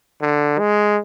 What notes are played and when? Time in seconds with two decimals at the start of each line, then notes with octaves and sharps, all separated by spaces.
0.21 D3
0.59 G#3